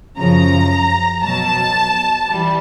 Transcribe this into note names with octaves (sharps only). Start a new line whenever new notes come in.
F#2 C#3 F3 A#5
B2 F#3 A5
E3 G3